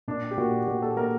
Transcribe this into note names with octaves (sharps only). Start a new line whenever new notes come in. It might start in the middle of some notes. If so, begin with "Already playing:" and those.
A#2 D4
G4
A#2 F#4
A#2 G4
A4
A#3 A#4